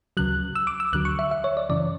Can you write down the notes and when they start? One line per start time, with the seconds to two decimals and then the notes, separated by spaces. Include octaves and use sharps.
0.17 D2 C#3 F#3 F#6
0.55 E6
0.67 D6
0.80 E6
0.93 D2 D3 F#3 F#6
1.05 C#6
1.19 E5
1.31 E5
1.44 C#5
1.57 D5
1.69 F#2 C#3 E3 D5